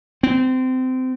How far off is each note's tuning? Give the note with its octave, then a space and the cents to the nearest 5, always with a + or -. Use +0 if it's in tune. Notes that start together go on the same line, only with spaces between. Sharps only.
C4 -25